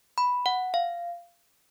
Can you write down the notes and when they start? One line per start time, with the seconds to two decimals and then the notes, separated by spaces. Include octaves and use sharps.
0.18 B5
0.46 F#5
0.74 F5